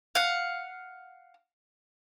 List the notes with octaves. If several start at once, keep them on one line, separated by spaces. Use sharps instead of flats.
F5 F#5